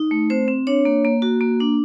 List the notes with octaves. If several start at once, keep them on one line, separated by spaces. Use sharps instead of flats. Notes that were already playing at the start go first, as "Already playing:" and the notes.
Already playing: D#4
A3
C4 C5
C4
D4 C#5
A#3
A#3
F#4
A#3
D4